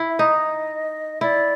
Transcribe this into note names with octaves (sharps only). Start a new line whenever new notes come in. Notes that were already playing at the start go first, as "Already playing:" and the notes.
Already playing: E4
E5
D#4 D#5
E4 D5